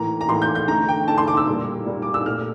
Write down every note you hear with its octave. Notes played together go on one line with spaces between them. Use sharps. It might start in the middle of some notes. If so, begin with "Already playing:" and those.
Already playing: A2 E3 A#3 A#5
A#5
A2 E3 A#3 C6
G6
G6
D3 A3 A#5
G5
D3 A3 A5
C6
D6
E6
A#2 G3 A#3
A#2 G3 A#3
D6
E6
A#2 A3 F6